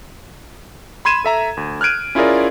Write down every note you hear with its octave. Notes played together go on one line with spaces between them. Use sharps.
B5 C6 G#6 D#7 E7
A4 E5 A#5
D2
F6 F#6 G#6 D7 D#7
C#4 E4 F4 G#4 A#4 D5